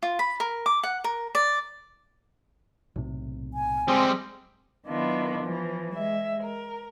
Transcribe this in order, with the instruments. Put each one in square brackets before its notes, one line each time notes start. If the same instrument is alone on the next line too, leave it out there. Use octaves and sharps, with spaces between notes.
[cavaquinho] F4
B5
A#4
D6
F#5
A#4
D5
[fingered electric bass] B1 A2 C3
[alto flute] G#5
[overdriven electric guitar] G3 G#3 [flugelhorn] C4
[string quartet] D#3 F#3 B3 D4 E4 F4
E3 F3
G#3 E5
A#4